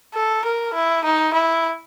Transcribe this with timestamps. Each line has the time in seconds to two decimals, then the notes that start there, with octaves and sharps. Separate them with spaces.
0.14 A4
0.45 A#4
0.74 E4
1.05 D#4
1.34 E4